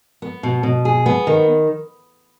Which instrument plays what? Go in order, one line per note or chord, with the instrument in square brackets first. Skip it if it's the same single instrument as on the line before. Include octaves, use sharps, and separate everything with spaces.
[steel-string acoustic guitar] B3
B2
B2
G#4
B3
D#3